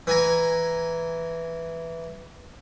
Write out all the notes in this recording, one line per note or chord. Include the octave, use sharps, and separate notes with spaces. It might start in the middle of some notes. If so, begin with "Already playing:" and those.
E3 G#5 A#5